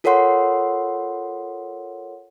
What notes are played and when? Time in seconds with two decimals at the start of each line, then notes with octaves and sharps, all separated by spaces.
0.04 F4 A4 A#4 C#5 F#5 C6